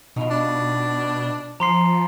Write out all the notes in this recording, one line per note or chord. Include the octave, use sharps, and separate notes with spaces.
B2 D#4 F4
D4
F3 A#5 C6 C7